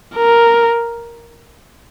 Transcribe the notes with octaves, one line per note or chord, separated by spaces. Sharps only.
A#4